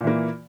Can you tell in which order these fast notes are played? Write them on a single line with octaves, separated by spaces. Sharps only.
A#2 E3 A#3